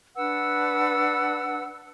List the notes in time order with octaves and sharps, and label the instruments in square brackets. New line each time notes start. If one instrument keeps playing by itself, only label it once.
[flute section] D4 B4 F#5 E6